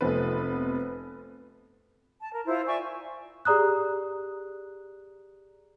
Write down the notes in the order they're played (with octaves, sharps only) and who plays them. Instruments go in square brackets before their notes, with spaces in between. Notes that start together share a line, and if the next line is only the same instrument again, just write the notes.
[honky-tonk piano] F1 C3 F3 B3 B4
[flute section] A5
A#4
E4 F4 C5
D5 E5 G#5 C#6
[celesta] G4 G#4 D5 A#5 D#6 F#6